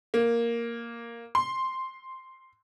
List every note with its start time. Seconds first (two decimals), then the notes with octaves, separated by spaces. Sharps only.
0.14 A#3
1.35 C6